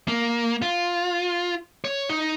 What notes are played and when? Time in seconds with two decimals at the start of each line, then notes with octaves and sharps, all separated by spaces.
0.08 A#3
0.62 F4
1.84 C#5
2.09 D#4